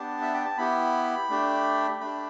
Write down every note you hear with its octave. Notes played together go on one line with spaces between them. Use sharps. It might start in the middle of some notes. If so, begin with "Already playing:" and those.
Already playing: B3 D4 G4 A5
E5
G5
A5
B3 E4 G4 B5
A3 D4 G4
A3 D4 G4 B5